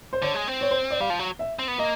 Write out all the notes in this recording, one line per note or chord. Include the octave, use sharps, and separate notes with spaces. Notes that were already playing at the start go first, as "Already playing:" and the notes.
C5
D3 C#5
G#3
C4
C#5
C5
D5
G3 F5
F3
F#3
E5
C4
B3
A#3 D#5